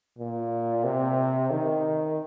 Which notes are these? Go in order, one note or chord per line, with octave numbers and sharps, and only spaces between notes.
A#2
C3
D#3